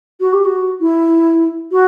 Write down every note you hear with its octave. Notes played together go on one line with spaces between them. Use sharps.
F#4
G4
F#4
E4
F#4